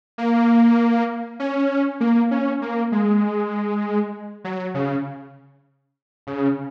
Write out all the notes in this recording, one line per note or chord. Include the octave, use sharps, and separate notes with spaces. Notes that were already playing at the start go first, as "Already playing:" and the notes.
A#3
C#4
A#3
C#4
A#3
G#3
F#3
C#3
C#3